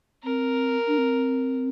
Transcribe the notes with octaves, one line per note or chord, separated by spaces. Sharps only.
C4 A#4
D4
C4